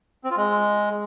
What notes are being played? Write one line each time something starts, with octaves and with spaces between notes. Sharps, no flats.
C4
F4
G#3